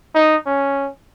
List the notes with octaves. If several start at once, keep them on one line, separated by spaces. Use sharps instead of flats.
D#4
C#4